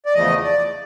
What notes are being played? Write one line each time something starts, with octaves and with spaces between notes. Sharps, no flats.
D5
E2 C#3 F3 A3 D#5
D5